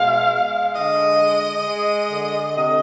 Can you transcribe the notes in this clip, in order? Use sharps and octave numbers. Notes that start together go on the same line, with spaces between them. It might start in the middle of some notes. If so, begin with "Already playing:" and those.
Already playing: B2 G#3 F5
G#3
D3 D#5
G#3
G#3
D3
C3 D#5